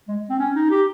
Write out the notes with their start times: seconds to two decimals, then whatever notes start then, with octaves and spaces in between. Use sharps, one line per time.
0.08 G#3
0.30 C4
0.39 C#4
0.55 D#4
0.71 G4